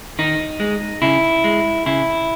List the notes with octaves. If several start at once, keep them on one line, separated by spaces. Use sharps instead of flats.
D#3 D#4
G#3
C#3 E4
G#3
C#3 E4